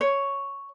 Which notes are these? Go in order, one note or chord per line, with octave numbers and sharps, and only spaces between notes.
C#5